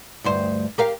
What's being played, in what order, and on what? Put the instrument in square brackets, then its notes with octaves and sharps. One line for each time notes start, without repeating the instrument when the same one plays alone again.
[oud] D2 G2 C5
G4 A#4 F5